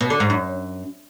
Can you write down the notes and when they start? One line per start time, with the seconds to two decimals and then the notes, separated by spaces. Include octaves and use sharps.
0.01 B2
0.10 D3
0.20 G#2
0.30 F#2